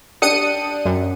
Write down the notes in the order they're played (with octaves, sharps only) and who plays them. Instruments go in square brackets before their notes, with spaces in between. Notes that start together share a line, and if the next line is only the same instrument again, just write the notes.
[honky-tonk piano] D4 G4 [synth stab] D#6 C#7 D#7
[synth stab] F#2